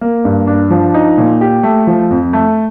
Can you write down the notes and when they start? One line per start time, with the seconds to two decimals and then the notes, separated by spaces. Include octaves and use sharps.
0.01 A#3
0.25 G2
0.47 D4
0.70 F3
0.94 D#4
1.18 A#2
1.41 G4
1.63 A3
1.87 F3
2.11 F2
2.33 A3